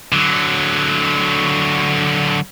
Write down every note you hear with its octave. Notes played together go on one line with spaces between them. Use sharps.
D3 F#3